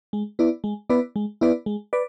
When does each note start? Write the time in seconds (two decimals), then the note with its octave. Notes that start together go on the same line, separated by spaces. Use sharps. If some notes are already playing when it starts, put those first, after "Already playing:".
0.13 G#3
0.39 B3 E4 B4 D5
0.64 G#3
0.90 B3 E4 B4 D5
1.16 G#3
1.41 B3 E4 B4 D5
1.66 G#3
1.93 B4 D5